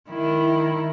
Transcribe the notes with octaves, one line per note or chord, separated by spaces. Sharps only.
D#3 E4